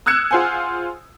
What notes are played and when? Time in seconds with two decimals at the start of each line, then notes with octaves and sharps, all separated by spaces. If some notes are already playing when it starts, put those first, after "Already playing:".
0.06 D#6 E6 F#6 G#6 C#7 E7
0.31 F4 G#4 C5 F#5 G#5